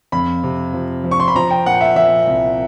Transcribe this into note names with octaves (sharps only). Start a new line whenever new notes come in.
F2 B5
C3
F3
F3
C#6
C6
B5
F3 A#5
G5
A#2 F#5
E5
F3 E5
C2